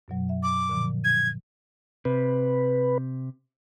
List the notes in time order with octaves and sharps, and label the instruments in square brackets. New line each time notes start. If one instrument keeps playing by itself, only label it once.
[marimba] F#2 B2 F#3
E5
[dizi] D6
[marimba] A#2 D3 F3
[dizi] G#6
[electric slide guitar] C3 [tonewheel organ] B4